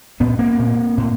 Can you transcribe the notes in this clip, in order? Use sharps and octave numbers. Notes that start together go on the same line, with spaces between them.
A#2 B3 C#4
A#3 C4
A#2
A2